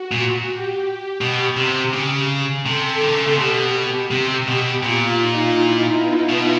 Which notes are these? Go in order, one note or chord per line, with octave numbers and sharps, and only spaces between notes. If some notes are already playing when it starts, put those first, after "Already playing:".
Already playing: F#4
A#2
G4
B2
C3
C#3
C3 A4
D3
C#3
C3
B2 G4
C3
B2
A#2 F4
D#4
E4
B3
B2